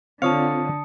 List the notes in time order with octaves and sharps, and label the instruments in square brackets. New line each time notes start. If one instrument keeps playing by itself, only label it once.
[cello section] D3 [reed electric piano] C4 F4 [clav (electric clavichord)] C#5 F5 [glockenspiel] A5 D#6 C#7